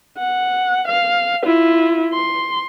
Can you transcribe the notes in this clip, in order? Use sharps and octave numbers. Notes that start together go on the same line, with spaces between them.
F#5
F5
E4 F4
C6